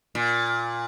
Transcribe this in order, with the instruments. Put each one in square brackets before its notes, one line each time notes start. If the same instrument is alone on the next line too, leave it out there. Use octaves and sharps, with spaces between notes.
[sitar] A#2